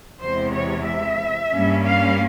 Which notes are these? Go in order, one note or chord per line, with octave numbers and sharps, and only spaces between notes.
E2 C3 E3 G#3 C5
C#5
E5
G2 G3 A#3 C#4
F5